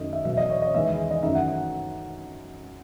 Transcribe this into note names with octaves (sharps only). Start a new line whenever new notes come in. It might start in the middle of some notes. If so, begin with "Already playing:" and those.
Already playing: F#2 D#3 A3 D#5
E5
E2 B2 F#3 E5
D#5
C#5
D#5
E2 D#3 G#3 B3 E5
D#5
F#2 D#3 A3 D#4 E5
F#5